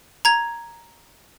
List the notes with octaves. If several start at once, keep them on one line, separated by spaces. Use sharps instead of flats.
A#5 G#6